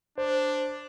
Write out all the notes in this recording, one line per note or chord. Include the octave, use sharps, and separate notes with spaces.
D4 C5